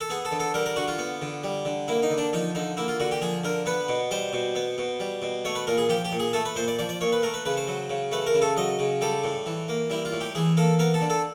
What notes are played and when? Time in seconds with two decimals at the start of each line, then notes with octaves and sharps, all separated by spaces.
0.01 A4
0.09 B3 G#4
0.25 A4
0.32 D3
0.40 A4
0.54 G3 A#4
0.66 A#4
0.76 D3 F#4
0.88 F4
0.98 B3
1.22 D3
1.44 G3
1.65 D3
1.88 A#3 E4
2.03 D#4
2.11 D3
2.18 D4
2.33 F3 D#4
2.55 D3 D#4
2.77 A#3 E4
2.88 F4
3.00 D3 F#4
3.11 G4
3.22 F3 G#4
3.44 D3 A#4
3.66 B3 B4
3.89 B2
4.11 G3 C5
4.33 B2
4.55 B3
4.78 B2
5.00 G3
5.22 B2
5.45 A3 C#5
5.55 B4
5.67 A#2 A#4
5.78 G#4
5.89 F3 G4
6.05 G4
6.12 A#2
6.20 G#4
6.33 A3 A4
6.45 B4
6.56 A#2 C5
6.68 D5
6.79 F3 D5
6.89 D5
7.01 A#2 C#5
7.12 B4
7.22 A3 A#4
7.34 B4
7.45 C#3 B4
7.57 C5
7.67 F#3
7.90 C#3
8.12 A3 B4
8.27 A#4
8.34 C#3
8.42 A4
8.57 F#3 D#5
8.79 C#3
9.01 G3 A4
9.24 A2
9.46 E3
9.69 A#3
9.90 G3 E4
10.05 F4
10.12 A2
10.21 G4
10.35 E3 G#4
10.57 A#3 A4
10.79 B3 A#4
10.94 A4
11.01 D3
11.10 A4